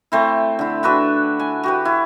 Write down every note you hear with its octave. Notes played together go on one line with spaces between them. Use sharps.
A3 C4 E4
D3 E4
D4 F#4 B4 E5
G#5
F#4 G4 B4
E4